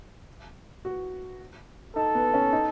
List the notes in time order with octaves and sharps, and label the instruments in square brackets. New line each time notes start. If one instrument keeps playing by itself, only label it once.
[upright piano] F#4
[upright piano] D#4 [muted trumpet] A4
[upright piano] B3
C#4
D#4